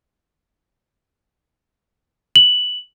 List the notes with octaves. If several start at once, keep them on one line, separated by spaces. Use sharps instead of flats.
F#7